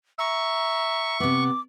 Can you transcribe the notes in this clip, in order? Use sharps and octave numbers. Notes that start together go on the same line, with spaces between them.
E5 A#5 C#6
C3 B3 D6